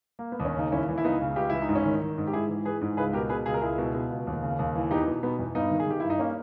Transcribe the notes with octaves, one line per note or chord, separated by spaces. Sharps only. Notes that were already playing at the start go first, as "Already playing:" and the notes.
A#3
B3
D#2
C#4
C#3 D#4
D#2 C#4 E4
E3
E4
C#2 B3 D#4
C#3
C#2 G4
E3 E4
D#4
G#2
C#4 E4
D#3
D#3
G#2
G4
G#2 E4 G#4
E3
E3 G#4 B4
G#2
C#2 G#4 B4
B2 G4 A#4
B2 G#4 B4
C#2 G#4
A#4
C#2 E4 G#4
B2
B2
C#2
D#2
C#3
D#2
E3
E2 D#4 G4
B2
B2 B3 D#4
E2
G2 B3 D#4
D#3
G#4
D#3 G4
G2 E4
D#4
A#3 C#4